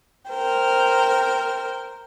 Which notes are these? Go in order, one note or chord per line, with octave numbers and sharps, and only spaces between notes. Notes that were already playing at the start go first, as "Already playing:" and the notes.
A#4 C5 G5